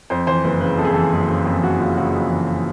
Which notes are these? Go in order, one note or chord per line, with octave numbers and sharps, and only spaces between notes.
F2 C5
E3 C5
F#1 B4
C#3 B4
F2 A4
G#4
E3 A4
F#1
C#3
F2 G#4
E3 F#4
F#1 F4
C#3 F#4
F2
E3